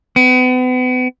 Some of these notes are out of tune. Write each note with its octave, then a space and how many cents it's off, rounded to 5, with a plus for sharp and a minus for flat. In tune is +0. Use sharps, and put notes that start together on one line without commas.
B3 +40